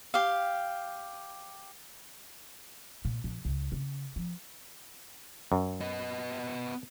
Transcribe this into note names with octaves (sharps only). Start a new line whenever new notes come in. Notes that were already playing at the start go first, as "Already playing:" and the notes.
G4 F5
A#2
A#1
C#2
C#3
F3
F#2
B3 D#5